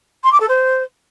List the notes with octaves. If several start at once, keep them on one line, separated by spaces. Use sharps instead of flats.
C6
D6
A4
C5